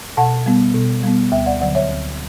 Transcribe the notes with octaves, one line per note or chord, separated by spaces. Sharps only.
B2 F#5 A5
G3 B3
B2
G3 B3
D2 E5 G5
D5 F#5
D3 F#3 D5 F#5
C#5 E5
D2